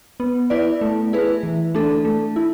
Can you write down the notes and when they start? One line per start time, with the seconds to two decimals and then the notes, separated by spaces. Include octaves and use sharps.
0.20 B3
0.50 E4 B4 D5
0.81 A3
1.13 E4 G#4 B4
1.43 E3
1.74 A3 D4 A4
2.05 A3
2.36 E4